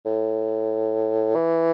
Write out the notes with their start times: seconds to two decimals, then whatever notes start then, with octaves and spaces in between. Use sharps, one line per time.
0.05 A2
1.35 E3